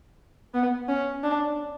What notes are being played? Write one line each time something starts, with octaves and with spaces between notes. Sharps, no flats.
B3
C#4
D4